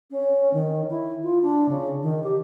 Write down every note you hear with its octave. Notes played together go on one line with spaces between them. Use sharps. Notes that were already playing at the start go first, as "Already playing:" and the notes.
C#4
D#3
E4
F4
D4
C#3
D#3
G4